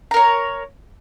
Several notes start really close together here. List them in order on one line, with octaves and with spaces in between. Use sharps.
A#5 A#4 C#5